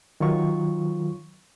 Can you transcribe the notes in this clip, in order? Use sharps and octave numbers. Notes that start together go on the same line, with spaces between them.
D#3 F#3 F4 C#6